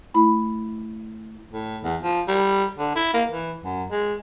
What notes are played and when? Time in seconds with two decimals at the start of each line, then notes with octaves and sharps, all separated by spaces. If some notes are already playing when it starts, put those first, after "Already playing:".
0.14 A3 E4 B5
1.52 A2
1.83 E2
2.02 F3
2.28 G3
2.79 D3
2.96 E4
3.13 A#3
3.31 E3
3.64 F#2
3.91 G#3